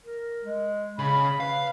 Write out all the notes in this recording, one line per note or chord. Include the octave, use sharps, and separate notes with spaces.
A#4
G#3
C#3 B5
B4 F5